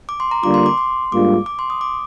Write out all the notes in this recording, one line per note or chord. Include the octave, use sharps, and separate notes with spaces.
D6
C6
A#5
D3 G3 A#3 D4 F4 D6
C6
D6
C6
G#2 G3 A#3 D4 F4 D6
D6
C6
D#6
D6